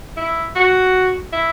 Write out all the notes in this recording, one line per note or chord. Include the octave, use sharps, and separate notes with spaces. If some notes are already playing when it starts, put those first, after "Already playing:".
E4
F#4
E4